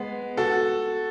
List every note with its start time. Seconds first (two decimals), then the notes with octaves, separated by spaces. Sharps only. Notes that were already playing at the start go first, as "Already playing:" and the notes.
Already playing: G#3 B3
0.37 F#4 A4